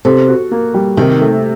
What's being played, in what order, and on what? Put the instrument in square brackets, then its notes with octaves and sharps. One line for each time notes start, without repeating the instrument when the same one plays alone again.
[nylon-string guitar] C3 [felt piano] A4
[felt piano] F#4
A#3
G3
[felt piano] C3 [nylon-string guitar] D#3
[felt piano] A3